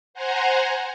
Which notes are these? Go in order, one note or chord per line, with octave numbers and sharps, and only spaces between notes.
C5 F#5 G#5 A#5